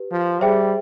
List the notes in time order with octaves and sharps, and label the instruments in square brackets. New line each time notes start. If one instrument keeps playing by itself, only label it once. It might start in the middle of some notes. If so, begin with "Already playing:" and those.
Already playing: [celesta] G4 B4
[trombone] F3
[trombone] G3 [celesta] G#4 C5 E5 G5